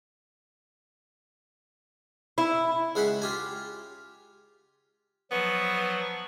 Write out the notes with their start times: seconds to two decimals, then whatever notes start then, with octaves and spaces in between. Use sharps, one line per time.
2.38 E4
2.95 C#2 G#4 F#5 G5 B5
3.22 F4 G4 G#5
5.31 F3 F#3 B3 C#6